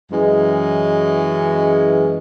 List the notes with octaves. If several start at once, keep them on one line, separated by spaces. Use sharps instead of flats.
F#2 E3 G#3